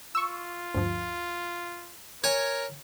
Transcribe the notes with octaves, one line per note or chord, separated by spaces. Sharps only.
F4 C#6 E6
D2 G2 F3
A#4 C#5 G#5